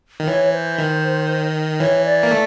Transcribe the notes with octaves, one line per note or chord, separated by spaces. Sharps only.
D#3
E3 C#5
C5
D#3
E3 C#5
D5
A#3
A3